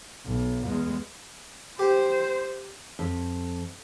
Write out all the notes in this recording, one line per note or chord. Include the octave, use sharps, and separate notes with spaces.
B1
E2 G#3
G4 C5
F2